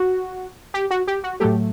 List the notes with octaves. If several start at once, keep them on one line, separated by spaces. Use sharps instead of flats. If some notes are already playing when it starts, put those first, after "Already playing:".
Already playing: F#4
G4
F#4
G4
F#4
A2 F#3 A3 G4